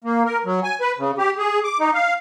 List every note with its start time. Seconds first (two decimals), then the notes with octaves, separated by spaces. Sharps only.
0.04 A#3
0.26 A#4
0.45 F#3
0.63 G#5
0.81 B4
0.98 C#3
1.18 G4
1.38 G#4
1.64 D6
1.80 D#4
1.94 F5